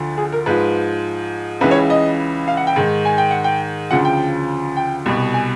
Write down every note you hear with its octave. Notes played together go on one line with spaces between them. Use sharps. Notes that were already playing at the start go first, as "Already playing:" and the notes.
Already playing: D2 D3 F3
G#4
A#4
G#2 F3 B4
C#2 C#3 E3 B4
C#5
D#5
F5
F#5
G5
G#2 D#3
G#5
G5
F#5
G5
D2 C#3 F3 F#5
G5
G5
C2 B2
G#5